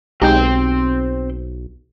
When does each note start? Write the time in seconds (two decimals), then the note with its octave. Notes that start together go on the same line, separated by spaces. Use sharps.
0.22 B1 G#3 C4 D#4 G4 G5